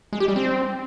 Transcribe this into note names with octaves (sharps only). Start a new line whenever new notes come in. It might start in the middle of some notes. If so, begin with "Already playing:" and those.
G#3
G4
G3
C4